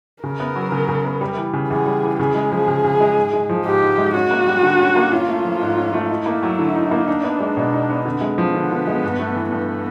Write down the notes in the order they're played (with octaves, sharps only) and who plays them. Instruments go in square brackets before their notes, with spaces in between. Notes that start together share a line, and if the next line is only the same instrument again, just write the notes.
[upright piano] C#3 [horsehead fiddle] A#4
[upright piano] B3
F#3
C#3
C#3
B3
G3
E3
C#3
[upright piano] E2 [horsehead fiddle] G#4
[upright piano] G3
E3
[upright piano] C#3 [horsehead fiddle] G#4
[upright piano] G#3
F3
C#3
C#3
G#3
G#2
G#3
F3
[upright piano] G#2 [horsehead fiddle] G4
[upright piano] G#2
G#3
[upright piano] C#4 [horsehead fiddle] F#4
[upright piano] A#3
G3
D3
C#4
A#3
[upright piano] C#4 [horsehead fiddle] F4
[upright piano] A3
F3
G#2
C#4
A3
[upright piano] D#4 [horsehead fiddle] E4
[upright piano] A#3
F#3
D3
D#4
A#3
[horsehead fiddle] D4 [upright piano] D#4
[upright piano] B3
G#3
B2
D#4
B3
[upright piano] D3 [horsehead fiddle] C4
[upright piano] G#3
F3
[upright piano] D3 [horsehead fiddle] B3
[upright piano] D3
G#3
G2
A3
E3
[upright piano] G2 [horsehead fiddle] B3